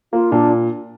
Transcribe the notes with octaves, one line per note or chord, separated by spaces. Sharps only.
A#3 F4
A#2 D4